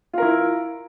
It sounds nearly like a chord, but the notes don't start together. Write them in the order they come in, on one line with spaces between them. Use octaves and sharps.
F4 A#4 E4